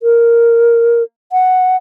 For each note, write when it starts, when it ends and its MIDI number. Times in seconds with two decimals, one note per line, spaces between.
0.03 1.03 70
1.32 1.76 78